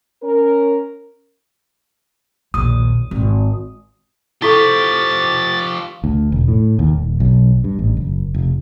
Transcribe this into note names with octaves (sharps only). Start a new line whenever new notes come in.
C#4 A#4
A#1 D#2 D#6
G#1
F3 E4 G4 A4 C#6 A6 B6 G7
D2
E1
A2
D#2
D#1
B1
G2
A1
F#1
F1